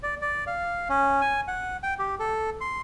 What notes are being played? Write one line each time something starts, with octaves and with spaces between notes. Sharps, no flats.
D5
D5
F5
C#4
G#5
F#5
G5
G4
A4
C6